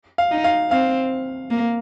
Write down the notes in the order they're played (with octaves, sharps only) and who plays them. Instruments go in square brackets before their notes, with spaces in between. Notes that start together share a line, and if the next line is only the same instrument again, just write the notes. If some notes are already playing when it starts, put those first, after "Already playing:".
[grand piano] F5
[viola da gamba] D#4
[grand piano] F5
[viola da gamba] C4 [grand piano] F5
[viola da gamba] A#3